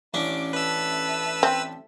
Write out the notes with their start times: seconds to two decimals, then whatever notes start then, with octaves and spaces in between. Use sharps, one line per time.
0.14 A1 C#4 D4 E4 D6
0.53 A4 B4 E5 E6
1.43 C4